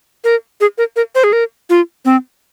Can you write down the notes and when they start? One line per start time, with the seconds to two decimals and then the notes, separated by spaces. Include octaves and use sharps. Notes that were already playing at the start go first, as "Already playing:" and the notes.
0.24 A#4
0.61 G#4
0.78 A#4
0.96 A#4
1.15 C5
1.24 G#4
1.33 A#4
1.70 F4
2.05 C4